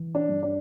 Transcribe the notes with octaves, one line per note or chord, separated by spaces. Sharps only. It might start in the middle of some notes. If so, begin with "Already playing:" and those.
Already playing: E3
D4
G2
D4